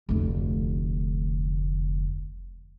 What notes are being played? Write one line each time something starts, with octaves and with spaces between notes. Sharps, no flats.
F1 D2